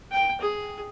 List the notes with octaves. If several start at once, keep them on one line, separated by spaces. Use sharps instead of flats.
G5
G#4